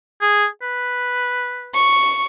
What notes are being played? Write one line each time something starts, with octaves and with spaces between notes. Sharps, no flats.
G#4
B4
C#6